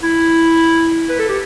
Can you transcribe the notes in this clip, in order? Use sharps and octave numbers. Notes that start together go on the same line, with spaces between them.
E4
B4
A4
G4